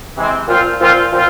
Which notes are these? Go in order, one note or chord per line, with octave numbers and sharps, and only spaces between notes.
C3 E3 G#3 C4
A#2 F3 C4 F4
A#2 F3 C4 F4
A#2 F3 C4 F4